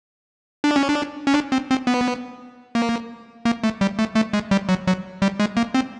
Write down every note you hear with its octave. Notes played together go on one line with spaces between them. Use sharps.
D4
C#4
D4
C#4
D4
C4
C4
B3
A#3
A#3
A3
G3
A3
A3
G#3
G3
F#3
F#3
G3
G#3
A#3
C4